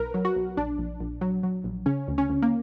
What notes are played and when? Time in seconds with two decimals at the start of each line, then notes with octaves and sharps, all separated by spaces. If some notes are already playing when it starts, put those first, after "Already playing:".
Already playing: B1 A#4 B4
0.14 F#3
0.25 F#4
0.36 B1
0.57 A#1 D4
0.78 A#1
1.00 A#1
1.21 F#3
1.43 F#3
1.64 A#1
1.86 C#3 C#4
2.07 D2
2.18 C#4
2.29 D2
2.42 A#3